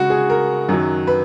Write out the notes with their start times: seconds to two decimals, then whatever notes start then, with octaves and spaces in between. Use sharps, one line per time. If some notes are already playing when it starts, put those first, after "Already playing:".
Already playing: C#3 G#3 F#4
0.10 G#4
0.30 A#4
0.69 F#2 D#3 F#3
1.07 B4